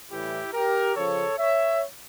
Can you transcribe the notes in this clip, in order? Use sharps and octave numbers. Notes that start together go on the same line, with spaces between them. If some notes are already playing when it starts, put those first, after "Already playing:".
A2 E3 G3 E4 G4
G4 A#4
C#3 F3 A4 C#5
C#5 E5